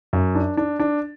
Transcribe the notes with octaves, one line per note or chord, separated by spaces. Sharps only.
F#2
D4
D4
D4